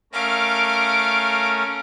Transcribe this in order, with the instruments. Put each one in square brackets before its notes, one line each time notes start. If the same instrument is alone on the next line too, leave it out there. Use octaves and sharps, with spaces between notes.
[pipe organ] A3 C#4 A#4 [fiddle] F5 D6